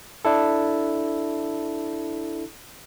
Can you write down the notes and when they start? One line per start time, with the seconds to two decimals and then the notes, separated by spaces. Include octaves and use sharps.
0.25 D4 E4 A4